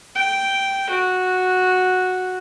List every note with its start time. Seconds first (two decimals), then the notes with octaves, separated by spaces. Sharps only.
0.16 G5
0.90 F#4